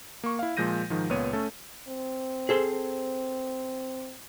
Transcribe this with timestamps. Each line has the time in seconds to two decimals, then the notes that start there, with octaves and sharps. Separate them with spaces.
0.24 A#3 C#6
0.39 E4 F5
0.57 A#2 F3 G#3 G6 A#6 D#7
0.90 G#2 D#3 F3
1.09 C#2 A#2 B3 C#5 D#7
1.33 A3 C#4 A4
1.88 C4
2.49 G#4 A4 C5